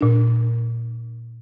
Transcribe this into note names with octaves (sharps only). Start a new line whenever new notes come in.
A#2 D4